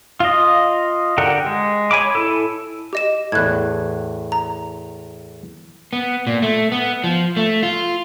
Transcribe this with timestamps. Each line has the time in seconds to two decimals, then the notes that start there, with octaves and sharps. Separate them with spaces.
0.20 F4 D#5
1.18 D3 G4 A#4 F#5
1.46 G#3
1.91 C#5 G#5 B5 D6
2.15 E4 A4
2.93 G4 D#5 E7
3.32 E2 A2 F#6 G#6
4.32 A#5
5.93 B3
6.27 A#2
6.42 A3
6.72 B3
7.04 F3
7.37 A3
7.63 F4